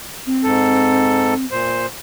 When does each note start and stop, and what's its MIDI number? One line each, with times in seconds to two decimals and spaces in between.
0.27 1.45 60
0.43 1.34 44
0.43 1.34 69
1.51 1.86 46
1.51 1.86 72